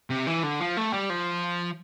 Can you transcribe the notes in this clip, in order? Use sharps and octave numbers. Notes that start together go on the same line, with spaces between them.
C3
E3
D3
F3
A3
G3
F3